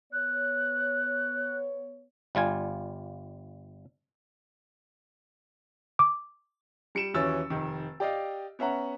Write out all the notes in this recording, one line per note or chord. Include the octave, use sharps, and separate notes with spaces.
B3 C#5 F#6
G1 G3 F4 G#5
D6
G3 C#7 D7 E7
D#2 E3 F#3 C#4 E6 A6
F1 D#3
G4 D5 D#5 F5
B3 C#4 E5 F#5 A#5